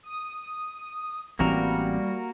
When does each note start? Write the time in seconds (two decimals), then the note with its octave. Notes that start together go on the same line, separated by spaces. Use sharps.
0.03 D#6
1.39 A1 E3 G3 A#3 C4 F#4 A#4